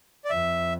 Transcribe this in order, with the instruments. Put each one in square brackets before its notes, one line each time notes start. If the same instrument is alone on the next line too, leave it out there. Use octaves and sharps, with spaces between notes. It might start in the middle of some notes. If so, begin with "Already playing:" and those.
[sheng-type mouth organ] D5
[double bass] F2 [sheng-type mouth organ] E5